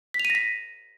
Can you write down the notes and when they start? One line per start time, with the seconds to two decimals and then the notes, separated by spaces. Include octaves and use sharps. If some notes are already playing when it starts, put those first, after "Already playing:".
0.14 B6
0.20 F7
0.25 D#7
0.30 A#6
0.35 B6